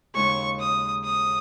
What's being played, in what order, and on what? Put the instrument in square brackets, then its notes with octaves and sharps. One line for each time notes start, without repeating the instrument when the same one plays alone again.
[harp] D#2 C#3 G#3 D#4 G#4 [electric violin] C#6
[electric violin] D#6
D#6